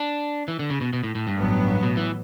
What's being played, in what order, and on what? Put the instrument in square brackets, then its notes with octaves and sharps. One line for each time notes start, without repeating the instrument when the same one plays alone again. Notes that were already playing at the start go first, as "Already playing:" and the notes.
Already playing: [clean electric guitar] D4
E3
D3
C#3
B2
B2
A2
A2
G2
[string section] A1 A2 F#3 B3
[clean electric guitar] B2
E3